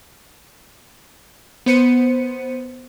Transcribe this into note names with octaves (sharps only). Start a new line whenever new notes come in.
B3 C5 C#7 D#7